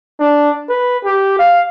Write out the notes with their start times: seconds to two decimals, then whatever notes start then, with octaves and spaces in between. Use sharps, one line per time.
0.20 D4
0.70 B4
1.05 G4
1.39 F5